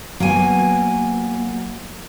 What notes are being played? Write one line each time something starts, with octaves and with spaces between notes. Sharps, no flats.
F#3 A#3 B3 G#5